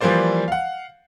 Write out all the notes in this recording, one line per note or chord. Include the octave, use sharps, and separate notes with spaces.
E3 F3 G3 A#3 C5 D5
F5 F#5